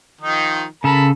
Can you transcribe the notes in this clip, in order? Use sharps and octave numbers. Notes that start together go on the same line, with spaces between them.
D#3 F3 D#4
C#3 A4 A#4 A5 B5